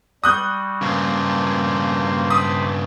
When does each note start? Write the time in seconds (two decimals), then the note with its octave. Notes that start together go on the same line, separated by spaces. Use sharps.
0.24 G3 F#4 D#6 F#6 G6
0.82 G2 C#3 A#3 C5
2.30 C5 B5 D6 D#6